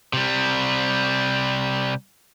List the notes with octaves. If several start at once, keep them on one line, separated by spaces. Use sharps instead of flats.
C3 G3